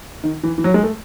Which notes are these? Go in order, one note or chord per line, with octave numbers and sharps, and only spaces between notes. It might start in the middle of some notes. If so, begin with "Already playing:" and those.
D#3
E3
E3
F#3
G#3
A3